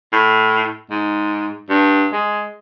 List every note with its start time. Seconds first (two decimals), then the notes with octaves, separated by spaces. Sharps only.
0.13 A2
0.90 G#2
1.69 G2
2.13 G#3